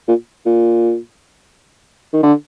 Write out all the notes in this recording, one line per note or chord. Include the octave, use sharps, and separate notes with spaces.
A#2
A#2
D#3
D3